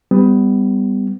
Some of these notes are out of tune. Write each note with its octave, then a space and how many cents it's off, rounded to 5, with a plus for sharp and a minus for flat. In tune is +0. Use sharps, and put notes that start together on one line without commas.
G3 +15 B3 +30